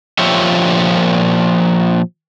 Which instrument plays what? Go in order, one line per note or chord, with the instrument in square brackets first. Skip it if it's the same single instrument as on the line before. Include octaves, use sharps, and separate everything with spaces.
[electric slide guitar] A#2 F3 F4 G4 C#5 E5